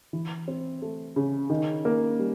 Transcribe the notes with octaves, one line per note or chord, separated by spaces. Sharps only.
E3
C4
A3
C#3
D#3
A#3
G3